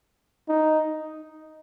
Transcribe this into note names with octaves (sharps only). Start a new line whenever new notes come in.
D#4